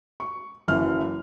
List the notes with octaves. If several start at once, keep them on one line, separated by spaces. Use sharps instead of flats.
C#6
F#1 F#2 E3 F6